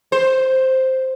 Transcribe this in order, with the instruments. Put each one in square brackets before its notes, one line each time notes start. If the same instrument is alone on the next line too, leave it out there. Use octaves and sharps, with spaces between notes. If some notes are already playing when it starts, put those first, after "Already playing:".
[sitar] C5